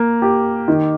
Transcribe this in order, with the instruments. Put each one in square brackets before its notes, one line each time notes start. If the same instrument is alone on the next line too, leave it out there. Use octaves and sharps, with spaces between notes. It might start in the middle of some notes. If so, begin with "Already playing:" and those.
Already playing: [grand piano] A#3
G4
D#3